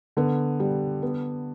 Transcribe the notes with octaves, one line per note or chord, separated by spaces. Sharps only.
D3 B3
G3
B3